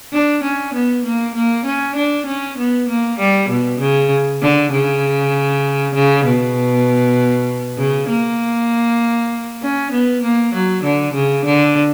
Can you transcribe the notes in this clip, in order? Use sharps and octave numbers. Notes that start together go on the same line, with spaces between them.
D4
C#4
B3
A#3
A#3
C#4
D4
C#4
B3
A#3
G3
B2
C#3
D3
C#3
C#3
B2
C#3
A#3
C#4
B3
A#3
F#3
D3
C#3
D3